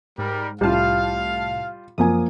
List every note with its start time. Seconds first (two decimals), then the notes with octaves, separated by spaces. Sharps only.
0.18 G#2 G3 A#4
0.61 C2 A2 G3 E4 F4 F5 A5
1.98 F#2 F3 A#3 G#5 D#6